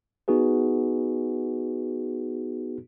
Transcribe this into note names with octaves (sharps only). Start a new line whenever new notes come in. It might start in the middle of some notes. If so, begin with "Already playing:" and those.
B3 D#4 F#4 G#4 B4